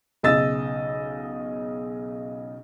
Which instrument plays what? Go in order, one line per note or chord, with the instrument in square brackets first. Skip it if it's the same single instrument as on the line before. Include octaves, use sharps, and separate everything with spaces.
[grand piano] B1 C#3 D#5 E6 A6